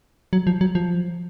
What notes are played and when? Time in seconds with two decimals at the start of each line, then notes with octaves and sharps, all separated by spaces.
0.33 F#3
0.47 F3
0.61 F#3
0.75 F3